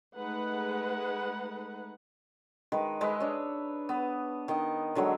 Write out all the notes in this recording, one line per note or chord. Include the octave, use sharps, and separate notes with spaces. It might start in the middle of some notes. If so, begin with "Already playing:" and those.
G#3 A3 D#4 B4 F#5
D#3 G#3 B4
G#3 B4 D#5 E5
D4 C#5
B3
D#3 D#5
D3 F#3 G#3 C#5